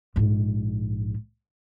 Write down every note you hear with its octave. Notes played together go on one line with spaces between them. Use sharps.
A#1 G#2